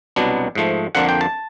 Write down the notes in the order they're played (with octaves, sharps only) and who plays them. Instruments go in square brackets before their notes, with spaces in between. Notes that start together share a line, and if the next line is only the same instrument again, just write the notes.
[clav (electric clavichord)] C2 B2 F#3 B3 D4
G#2 F3 A3
F2 D3 F3 A#3 D4 F#5
G5
A5